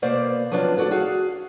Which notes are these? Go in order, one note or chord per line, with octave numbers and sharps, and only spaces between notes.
B2 A#3 C5 D5 F5
F3 F#3 B3 D4 F4
D4 F#4 A4 C#5
F#4 G#4 F5